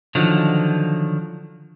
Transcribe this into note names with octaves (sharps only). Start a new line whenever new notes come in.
D3 D#3 F3 F#3